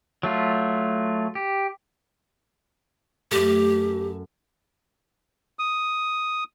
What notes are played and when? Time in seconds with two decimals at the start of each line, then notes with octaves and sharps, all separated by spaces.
0.23 F#3 A3 F4
1.35 G4
3.31 F#2 A3 G4
5.59 D#6